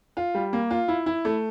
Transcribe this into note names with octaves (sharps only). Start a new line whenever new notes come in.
F4
G3
A#3
F4
E4
E4
A3